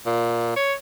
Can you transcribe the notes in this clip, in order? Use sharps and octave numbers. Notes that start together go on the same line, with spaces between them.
A#2
C#5